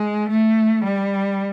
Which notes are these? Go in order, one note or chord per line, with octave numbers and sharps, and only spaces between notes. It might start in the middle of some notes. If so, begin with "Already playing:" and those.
Already playing: G#3
A3
G3